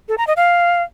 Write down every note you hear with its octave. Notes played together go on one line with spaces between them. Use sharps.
A4
A#5
D#5
F5